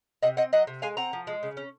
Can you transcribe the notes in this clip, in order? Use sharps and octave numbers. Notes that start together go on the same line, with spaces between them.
C3 D#5 F#5
C4 D#5 F#5
F#3 D#5 F#5
C3
G#3 F5 G#5
C4 F#5 A#5
F3
G#3
C#3
C#4